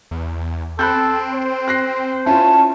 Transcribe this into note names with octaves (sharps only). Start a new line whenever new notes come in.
E2
C4 A4 B5 F#6 G6
C5
F#6 A#6 C7
C#4 E4 F4 A5